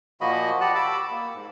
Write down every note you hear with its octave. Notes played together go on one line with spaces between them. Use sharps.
A#2 F3 A#3 F#4 D#5 B5
G4 D5 F#5 A5 F#6
B5 D6 E6
A#3
G#2